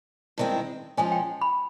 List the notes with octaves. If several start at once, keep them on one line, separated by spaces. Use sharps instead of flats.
G2 D#3 G#3 C4 E4
F3 G#3 C#4 G#5
G5
B5